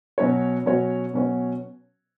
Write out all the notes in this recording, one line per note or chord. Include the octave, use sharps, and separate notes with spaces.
B2 F#3 C#4 F#4 C#5
B2 F#3 C#4 F#4 C#5
B2 F#3 C#4 F#4 C#5